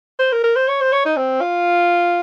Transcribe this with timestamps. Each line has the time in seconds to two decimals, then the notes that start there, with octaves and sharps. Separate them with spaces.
0.19 C5
0.32 A#4
0.44 A#4
0.56 C5
0.68 C#5
0.81 C5
0.93 C#5
1.05 D#4
1.17 C4
1.41 F4